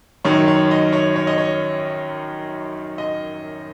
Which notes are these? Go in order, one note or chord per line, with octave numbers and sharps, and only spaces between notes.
F#2 D#3 F#3 C#5
C#5
D#5
C#5
C#5
D#5
C#5
D#5